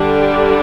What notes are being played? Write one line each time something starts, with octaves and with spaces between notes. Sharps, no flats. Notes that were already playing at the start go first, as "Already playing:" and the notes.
Already playing: D3 G3 D4
G4